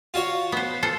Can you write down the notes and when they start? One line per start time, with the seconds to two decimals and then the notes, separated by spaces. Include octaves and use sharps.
0.14 F4 F#4 C#5
0.52 B3 C5
0.83 F4 A4 C5